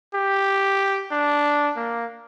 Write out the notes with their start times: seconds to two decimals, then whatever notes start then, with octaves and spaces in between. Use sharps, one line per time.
0.15 G4
1.12 D4
1.77 A#3